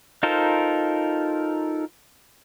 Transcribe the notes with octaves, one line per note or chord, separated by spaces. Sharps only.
D#4 F4 A4 A#4 C5